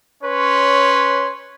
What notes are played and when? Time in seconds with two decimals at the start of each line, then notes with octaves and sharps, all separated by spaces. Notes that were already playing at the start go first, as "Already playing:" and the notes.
0.23 C#4 B4 C#5 C6